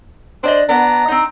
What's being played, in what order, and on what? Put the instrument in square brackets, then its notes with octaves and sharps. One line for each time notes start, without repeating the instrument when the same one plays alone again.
[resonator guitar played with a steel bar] D4 D5 D#5 [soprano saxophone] C5
[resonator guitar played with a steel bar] B3 D4 [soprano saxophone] A#5
[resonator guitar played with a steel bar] C4 D#4